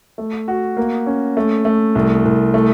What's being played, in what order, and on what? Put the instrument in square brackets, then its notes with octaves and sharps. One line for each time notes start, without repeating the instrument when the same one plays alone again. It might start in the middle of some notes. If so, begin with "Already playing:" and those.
[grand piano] A3
F#4
A#3
C#4
A3
A3
C2
C2
A3